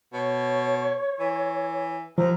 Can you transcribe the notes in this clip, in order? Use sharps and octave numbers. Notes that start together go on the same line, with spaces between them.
B2 C#5
E3
D#2 F3 A#5